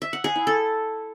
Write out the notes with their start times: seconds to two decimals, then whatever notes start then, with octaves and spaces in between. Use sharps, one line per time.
0.02 E5
0.13 F#5
0.24 G#4
0.36 E4
0.47 A4